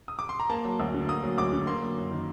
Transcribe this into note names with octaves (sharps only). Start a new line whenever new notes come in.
D#6
D6
C6
A#5
A#3 A5
F#3
D2
D3
A#3 D#6
F#3
D2 D6
D3
A#3 C6
F#3
F#2
D#3